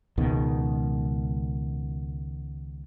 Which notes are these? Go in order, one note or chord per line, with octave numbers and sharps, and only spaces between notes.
C#2 B2 D#3